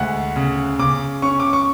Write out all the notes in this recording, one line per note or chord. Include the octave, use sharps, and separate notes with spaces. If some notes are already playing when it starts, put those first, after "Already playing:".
Already playing: D2 G#3 F#5
C#3
C#3 D6
C#4 C#6
D6
C#6